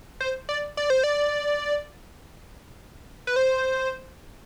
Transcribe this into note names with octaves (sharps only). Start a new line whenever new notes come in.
C5
D5
D5
C5
D5
B4
C5